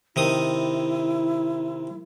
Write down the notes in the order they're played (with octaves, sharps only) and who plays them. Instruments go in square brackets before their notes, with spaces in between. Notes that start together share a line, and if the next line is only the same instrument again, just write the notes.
[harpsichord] C3 D#3 D#6 [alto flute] E4